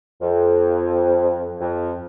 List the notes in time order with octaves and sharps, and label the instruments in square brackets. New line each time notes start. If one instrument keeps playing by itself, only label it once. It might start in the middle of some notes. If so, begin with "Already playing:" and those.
[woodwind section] F2
F2